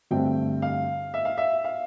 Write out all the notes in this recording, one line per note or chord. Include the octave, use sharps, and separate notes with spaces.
G2 D3 A3 C4 G5
F5
E5
F5
E5
F5